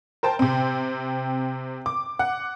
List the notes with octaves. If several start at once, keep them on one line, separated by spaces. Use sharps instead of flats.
A#4 C5 G5 A5
C3 C4
D6
F#5